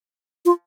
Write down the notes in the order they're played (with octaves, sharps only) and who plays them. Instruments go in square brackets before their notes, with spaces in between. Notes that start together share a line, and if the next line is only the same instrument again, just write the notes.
[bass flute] F4